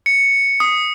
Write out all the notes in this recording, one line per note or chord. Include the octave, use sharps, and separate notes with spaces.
C#7
D#6